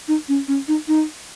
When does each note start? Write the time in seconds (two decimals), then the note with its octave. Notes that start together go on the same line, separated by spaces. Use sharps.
0.08 D#4
0.29 C#4
0.48 C#4
0.68 D#4
0.88 D#4